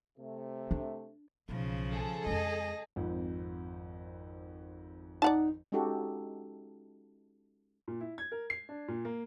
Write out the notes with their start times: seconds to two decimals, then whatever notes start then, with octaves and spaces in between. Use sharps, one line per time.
0.18 C3 A3
0.71 D4
1.49 B1 C#3 F3
1.93 G#4 A4 A5
2.26 F2 G#3 D#5
2.96 G#1 F2
5.22 D#4 D5 F#5 A5
5.72 G#3 C#4 D#4 F#4 G4 A4
7.88 A#2
8.01 E4
8.18 G#6
8.32 A#4
8.50 C7
8.69 D4
8.88 A#2
9.05 A#3